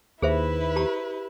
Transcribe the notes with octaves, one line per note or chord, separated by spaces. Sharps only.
D#2 E4 G#4 B4 C5 E5
G4 A#5